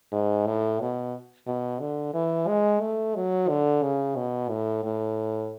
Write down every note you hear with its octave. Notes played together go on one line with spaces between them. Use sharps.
G#2
A2
B2
B2
D3
E3
G#3
A3
F#3
D3
C#3
B2
A2
A2